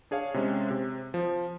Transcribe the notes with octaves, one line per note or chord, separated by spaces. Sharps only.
D4 G#4 C#5 F5
C3 G#3 C#4
C3
F3